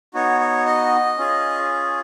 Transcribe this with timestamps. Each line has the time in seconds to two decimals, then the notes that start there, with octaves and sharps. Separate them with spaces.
0.14 B3 D#4 F#4 C#5
0.40 C#5
0.66 D#5
1.18 C#4 F4 G#4